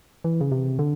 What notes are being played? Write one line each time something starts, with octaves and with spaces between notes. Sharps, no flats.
E3
C#3
C3
D3